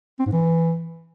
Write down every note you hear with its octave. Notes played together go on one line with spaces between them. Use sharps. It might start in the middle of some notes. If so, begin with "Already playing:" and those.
C4
G#2
E3